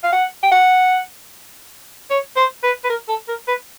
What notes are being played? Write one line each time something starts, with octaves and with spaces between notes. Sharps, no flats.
F5
F#5
G5
F#5
C#5
C5
B4
B4
A#4
A4
A#4
B4